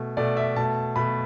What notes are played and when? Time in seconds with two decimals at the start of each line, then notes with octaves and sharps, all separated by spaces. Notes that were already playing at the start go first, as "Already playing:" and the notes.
Already playing: B2 A3
0.17 B2 A3 D5
0.37 E5
0.56 B2 A3 A5
0.96 B2 A3 B5